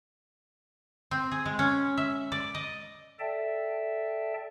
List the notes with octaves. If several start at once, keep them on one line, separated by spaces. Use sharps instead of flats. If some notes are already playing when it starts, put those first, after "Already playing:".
C4
G#4
G#3
C#4
E5
D5
D#5
A4 D5 E5 G5 A5